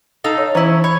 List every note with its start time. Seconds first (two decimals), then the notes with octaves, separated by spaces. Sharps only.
0.24 D#4 A4 F5
0.38 C#5
0.55 E3 C#4 E4 C5 A#5
0.84 C#5 B5